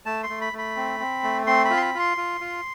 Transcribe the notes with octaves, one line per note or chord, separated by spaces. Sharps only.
A3 A5
C6
A3
B5
A3
B5
C4
C4
A3
C4 C6
B5
F4
C6
B5
F4 C6
F4
F4